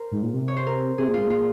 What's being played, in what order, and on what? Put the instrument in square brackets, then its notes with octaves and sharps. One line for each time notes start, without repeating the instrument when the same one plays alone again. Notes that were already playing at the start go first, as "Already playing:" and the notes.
Already playing: [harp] A#4 C5
[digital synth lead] G#2
A#2
C3
[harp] C#5
C5
A#4
[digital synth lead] C3 [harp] G#4
[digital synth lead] A#2
[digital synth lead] G#2 [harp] F4
[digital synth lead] A#2 [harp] F4